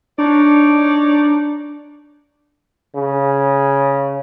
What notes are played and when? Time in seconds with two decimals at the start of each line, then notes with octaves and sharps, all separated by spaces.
0.18 D4 D#4 C#5 D5
2.95 C#3